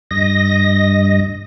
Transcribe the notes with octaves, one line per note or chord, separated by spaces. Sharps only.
G2 D#5 A#6